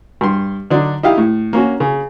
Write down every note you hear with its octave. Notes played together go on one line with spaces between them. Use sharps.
G2 C6
D3 F#3 D4 D#4
D#4 E4 G4 F5
A2
A#3 C#4 F#4
C#3